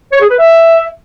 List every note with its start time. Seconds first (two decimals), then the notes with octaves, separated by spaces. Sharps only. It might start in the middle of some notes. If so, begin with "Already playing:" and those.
0.13 C#5
0.21 G#4
0.30 B4
0.38 E5